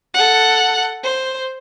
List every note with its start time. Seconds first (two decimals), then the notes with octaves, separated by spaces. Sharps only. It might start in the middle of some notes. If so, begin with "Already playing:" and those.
0.14 A4 F#5
1.04 C5